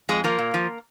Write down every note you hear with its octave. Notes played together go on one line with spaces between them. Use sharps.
F2 G#3 G#4
F3 A#3 A#4
A#2
F3